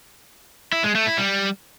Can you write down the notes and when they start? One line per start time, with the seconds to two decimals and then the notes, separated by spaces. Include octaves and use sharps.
0.72 E4
0.84 G#3
0.95 A3
1.07 E4
1.18 G3